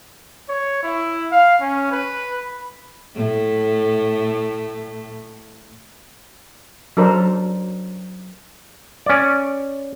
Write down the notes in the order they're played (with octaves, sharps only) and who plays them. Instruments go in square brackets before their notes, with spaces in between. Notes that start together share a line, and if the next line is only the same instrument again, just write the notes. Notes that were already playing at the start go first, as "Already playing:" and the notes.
[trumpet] C#5
E4
F5
C#4
B4
B5
[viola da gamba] A2 A3
[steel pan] F#3 D4 A4 A#4 C5
[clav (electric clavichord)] C#4 D5